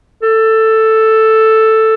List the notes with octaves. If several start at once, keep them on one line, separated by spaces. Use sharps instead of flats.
A4